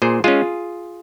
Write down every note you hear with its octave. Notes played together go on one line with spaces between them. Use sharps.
A#2 G#4 C5
G#3 C#4 F4 G#4